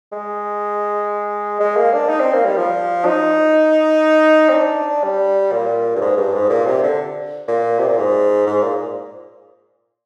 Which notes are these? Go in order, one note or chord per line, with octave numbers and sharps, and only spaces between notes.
G#3
G#3
A#3
D4
D#4
C4
A#3
G3
F3
D#4
C4
D4
G3
A#2
G2
G#2
G2
G#2
A#2
C3
D3
A#2
C3
A#2
G#2
G#2
A#2